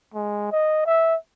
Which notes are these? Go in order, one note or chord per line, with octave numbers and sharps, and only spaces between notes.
G#3
D#5
E5